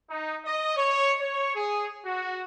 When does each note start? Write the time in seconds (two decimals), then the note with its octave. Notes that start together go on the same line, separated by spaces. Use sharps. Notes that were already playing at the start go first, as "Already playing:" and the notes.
0.10 D#4
0.45 D#5
0.76 C#5
1.20 C#5
1.55 G#4
2.05 F#4